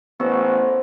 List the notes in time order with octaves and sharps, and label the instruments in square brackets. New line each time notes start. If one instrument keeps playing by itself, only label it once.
[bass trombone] A1 [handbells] B3 [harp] C5